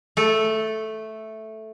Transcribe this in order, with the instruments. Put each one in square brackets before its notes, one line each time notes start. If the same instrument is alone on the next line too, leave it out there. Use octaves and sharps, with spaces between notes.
[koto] A3 A4